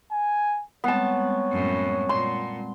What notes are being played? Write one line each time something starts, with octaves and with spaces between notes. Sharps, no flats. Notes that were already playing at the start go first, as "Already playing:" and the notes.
G#5
G3 G#3 B3 C4 C#5 A5
F#2 A2
A#2 C6